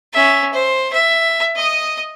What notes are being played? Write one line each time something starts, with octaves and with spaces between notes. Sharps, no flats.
C#4 E5
C5
E5
D#5 D#6